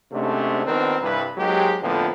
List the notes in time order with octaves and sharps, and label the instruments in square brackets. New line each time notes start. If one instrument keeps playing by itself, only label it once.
[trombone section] G#2 C3 A3 C#4 D4
A#1 D#3 B3 C4 D4 A#4
C2 G2 B4
G#2 F#3 G#3 A#3 G4
F2 A2 D3 F3 A#3 B3